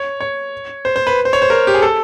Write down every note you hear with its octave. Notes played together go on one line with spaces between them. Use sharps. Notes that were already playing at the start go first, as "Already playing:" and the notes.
Already playing: C#5
C#5
C5
C5
B4
C5
C#5
C5
A#4
G4
G#4
A4